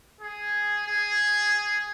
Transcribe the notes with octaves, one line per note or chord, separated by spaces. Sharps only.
G#4
G#4